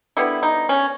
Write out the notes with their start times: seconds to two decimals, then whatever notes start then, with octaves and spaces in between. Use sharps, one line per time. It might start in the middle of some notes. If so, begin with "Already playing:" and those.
0.17 D3 G3 B3 E4
0.43 D#4
0.69 C#4